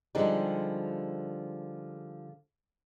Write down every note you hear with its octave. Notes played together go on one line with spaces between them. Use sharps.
D3 F3 G3 G#3 D#4 G4